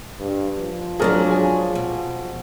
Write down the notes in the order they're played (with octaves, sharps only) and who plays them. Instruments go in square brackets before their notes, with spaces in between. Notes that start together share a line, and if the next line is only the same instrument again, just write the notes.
[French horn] G2
F3
[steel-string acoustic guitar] G#2 F#3 D4 [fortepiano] G#4 A#4 D5
[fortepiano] G#4 G#5
[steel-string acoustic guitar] B2